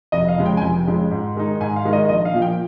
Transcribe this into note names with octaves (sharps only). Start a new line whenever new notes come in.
F1 D#5
F5
F2 C#3 G#3
G5
G#5
F1 G5
F2 C#3 G#3
G#2
D#3 G#3 D#4
G#2 G#5
F5
D#3 G#3 D#4
D#5
A#1 D#5
F5
A#2 F3
G5